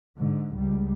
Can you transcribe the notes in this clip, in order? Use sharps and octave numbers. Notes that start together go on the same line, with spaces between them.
G#2 D3
C#2 G3